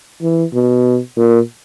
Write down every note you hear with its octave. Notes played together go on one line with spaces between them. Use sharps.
E3
B2
A#2